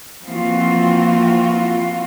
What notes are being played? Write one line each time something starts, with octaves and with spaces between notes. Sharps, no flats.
E3 F3 A#3 C4 F4 F#4